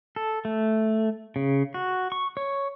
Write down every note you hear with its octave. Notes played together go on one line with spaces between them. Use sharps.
A4
A3
C#3
F#4
C#6
C#5